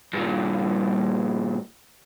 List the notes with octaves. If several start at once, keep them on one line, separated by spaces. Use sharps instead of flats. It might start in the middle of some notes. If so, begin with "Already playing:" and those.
G2 A#2